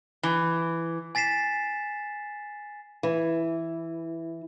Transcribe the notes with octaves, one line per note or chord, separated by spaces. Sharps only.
E3
G#5 A6 B6 C7 E7
E3